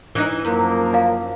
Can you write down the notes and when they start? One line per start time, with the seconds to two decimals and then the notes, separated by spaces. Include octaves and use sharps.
0.15 E3 D#4
0.45 F#2 F3 A#3
0.94 F5